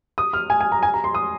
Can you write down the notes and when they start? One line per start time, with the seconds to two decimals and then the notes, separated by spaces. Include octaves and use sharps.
0.18 D#6
0.33 F6
0.50 G#5
0.61 G#5
0.72 A#5
0.83 G#5
0.94 A#5
1.04 C6
1.15 D#6